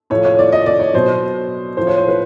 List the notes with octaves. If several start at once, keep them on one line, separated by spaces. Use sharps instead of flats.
A2 F3 C#5
C#5
D5
D#5
D5
C#5
B2 F#3 C5
A2 F3 C5
C#5
C5
B4